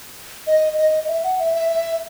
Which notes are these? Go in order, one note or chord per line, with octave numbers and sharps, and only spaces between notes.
D#5
D#5
E5
F#5
E5
E5
E5